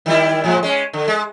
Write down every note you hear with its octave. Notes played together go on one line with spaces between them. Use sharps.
D#3 G3 E4
A2 F3 G#3
G#3 C#4
D3
G#3